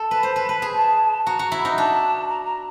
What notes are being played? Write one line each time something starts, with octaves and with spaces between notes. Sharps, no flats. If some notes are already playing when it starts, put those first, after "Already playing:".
Already playing: A4 A5
B4
C5
B4
B4
G#4
A5
F#4 A#5
F#4
E4
D#4
D4 A5
A#5
A#5